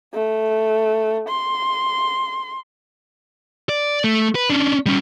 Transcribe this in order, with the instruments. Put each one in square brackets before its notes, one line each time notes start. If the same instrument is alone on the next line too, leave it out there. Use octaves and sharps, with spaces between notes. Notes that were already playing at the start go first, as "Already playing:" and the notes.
[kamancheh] A3
C6
[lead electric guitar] D5
A3
B4
C#4 D4
G3 C#4